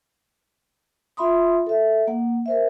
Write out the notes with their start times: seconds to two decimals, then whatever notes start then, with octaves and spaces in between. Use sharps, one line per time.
1.17 F4 E5 B5 C6 D#6
1.67 A4 E5
2.07 A#3 F#5
2.46 A#4 C5 E5